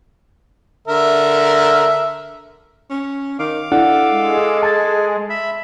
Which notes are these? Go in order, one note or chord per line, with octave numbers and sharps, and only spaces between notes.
D3 A#4 E5
C#4
D#3 F5 D6
D4 E4 A4 F#5
G#3
G#5 A5 A6
E5 B5